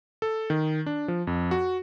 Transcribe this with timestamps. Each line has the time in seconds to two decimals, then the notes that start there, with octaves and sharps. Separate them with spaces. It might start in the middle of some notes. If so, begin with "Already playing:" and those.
0.22 A4
0.50 D#3
0.86 D4
1.08 F3
1.27 F2
1.51 F#4